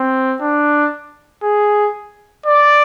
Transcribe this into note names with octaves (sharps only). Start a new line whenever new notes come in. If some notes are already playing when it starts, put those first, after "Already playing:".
Already playing: C4
D4
G#4
D5